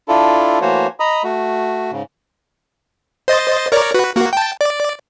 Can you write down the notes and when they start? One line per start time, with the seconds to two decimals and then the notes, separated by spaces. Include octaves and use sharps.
0.08 D4 E4 F4 A4
0.61 E3 A3 A#3 F#4 C5 C#5
1.00 D#5 A#5 B5 D#6
1.24 A3 F#4
1.91 G#2 C#3
3.28 C5 D#5 A6
3.72 A#4 C#5 D5
3.94 F#4 B4
4.16 A#3 F#4
4.33 G5 A5
4.61 D5